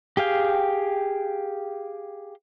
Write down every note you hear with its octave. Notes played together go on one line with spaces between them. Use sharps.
G4 G#4 F5 G5